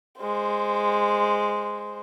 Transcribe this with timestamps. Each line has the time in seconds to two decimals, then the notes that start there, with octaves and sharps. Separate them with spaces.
0.20 G#3 C5